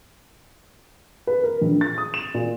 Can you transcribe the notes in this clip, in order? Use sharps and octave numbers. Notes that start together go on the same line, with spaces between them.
B4
A#4
A#1
A6
D#6
E7
A#2